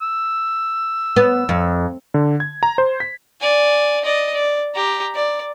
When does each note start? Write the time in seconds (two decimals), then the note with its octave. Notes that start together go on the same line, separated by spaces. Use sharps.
0.02 E6
1.16 B3
1.49 F2
2.14 D3
2.40 G#6
2.63 A#5
2.78 C5
3.00 B6
3.41 D5 G#5
4.04 D5 D#5
4.34 D5
4.74 G4 A#5
5.15 D5